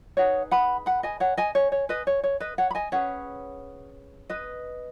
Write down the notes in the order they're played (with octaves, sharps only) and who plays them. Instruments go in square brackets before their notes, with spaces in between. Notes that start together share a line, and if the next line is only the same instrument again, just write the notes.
[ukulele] D#4 G#4 B4 C#5 F#5
F#5 B5
F#5 B5
D#5 G#5
C#5 F#5
D#5 G#5
C#5
C#5
B4 D#5
C#5
C#5
B4 D#5
C#5 F#5
B5
D#5 G#5
C#4 G#4 B4 C#5 F#5
B4 D#5